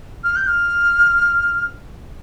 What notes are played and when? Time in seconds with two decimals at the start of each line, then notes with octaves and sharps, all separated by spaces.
0.23 F6
0.36 G6
0.46 F6